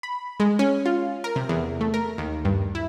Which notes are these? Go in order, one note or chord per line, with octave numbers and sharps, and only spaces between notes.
B5
G#3
C#4
F4
A#4
C3
E2
A3
A#4
D#2
G2
E4